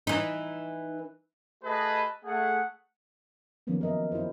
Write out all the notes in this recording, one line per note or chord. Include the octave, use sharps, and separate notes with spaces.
E3 D#4
A3 G4 G#4 B4 D#5 A5
A3 G#4 F#5
D#3 F3 F#3 A#3 B3 C#4
A#4 D#5 E5
E4 F4 G4 C5